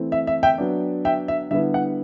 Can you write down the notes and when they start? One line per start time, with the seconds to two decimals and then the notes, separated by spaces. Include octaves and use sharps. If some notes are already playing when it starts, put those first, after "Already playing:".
Already playing: E3 A3 C4 E4
0.12 E5
0.27 E5
0.43 E5 G5
0.58 F#3 B3 D4
1.05 E5 G5
1.28 E5
1.51 D3 G3 B3 E4 E5
1.74 F#5